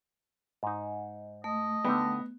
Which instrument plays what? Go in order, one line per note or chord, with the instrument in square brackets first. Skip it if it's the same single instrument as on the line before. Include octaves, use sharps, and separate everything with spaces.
[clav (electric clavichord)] G#2 D#4
[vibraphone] A3 [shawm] D#5
[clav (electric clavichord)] D3 D#4 G5 [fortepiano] B3